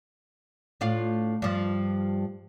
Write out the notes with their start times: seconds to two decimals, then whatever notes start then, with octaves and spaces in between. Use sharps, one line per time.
0.81 A2 D4 F4
1.42 G2 F3